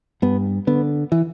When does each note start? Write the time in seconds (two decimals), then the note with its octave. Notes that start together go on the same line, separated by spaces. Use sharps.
0.22 G2 B3
0.67 D3 B3
1.12 E3